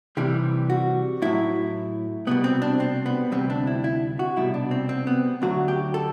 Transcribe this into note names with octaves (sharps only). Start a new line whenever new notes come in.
C2 C3 E3 G3 G4
F#4
A2 F#3 E4
C2 B2 G3 B3
C4
D4
C4
B3
D2 C3 G3 C4
D4
E4
E4
F#4
C2 B2 G3 E4
D4
C4
C4
B3
D2 D3 F#3 F#4
G4
A4